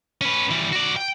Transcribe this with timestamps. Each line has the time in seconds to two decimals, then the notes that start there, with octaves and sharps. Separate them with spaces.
0.21 C#4 B4
0.51 E3 G3
0.72 F#4 D5
0.96 G5